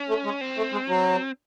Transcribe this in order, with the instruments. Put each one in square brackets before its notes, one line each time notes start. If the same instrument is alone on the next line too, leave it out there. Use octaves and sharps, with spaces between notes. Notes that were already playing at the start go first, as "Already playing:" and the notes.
Already playing: [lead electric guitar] C#4
[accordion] A3
G#3
[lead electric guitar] C4
[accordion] A3
G#3
F#3